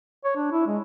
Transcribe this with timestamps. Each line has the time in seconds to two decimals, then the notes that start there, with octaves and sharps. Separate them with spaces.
0.24 C#5
0.36 D4
0.52 E4
0.67 G#3